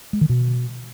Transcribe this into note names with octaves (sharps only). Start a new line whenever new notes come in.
G#3
D#3
B2